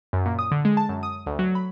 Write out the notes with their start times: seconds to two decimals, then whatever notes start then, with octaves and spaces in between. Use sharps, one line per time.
0.13 F#2
0.26 A#2
0.39 D#6
0.51 D3
0.65 G#3
0.77 A5
0.89 F#2
1.03 D#6
1.26 D2
1.39 F#3
1.55 B5